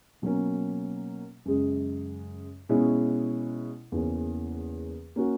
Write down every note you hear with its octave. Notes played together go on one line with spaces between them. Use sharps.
B2 F#3 A#3 C#4
F#2 C#3 G#3
B2 G#3 C#4 E4
E2 C#3 E3 A#3 C#4
A#3 C#4 F#4